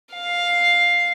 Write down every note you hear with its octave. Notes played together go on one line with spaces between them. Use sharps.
F5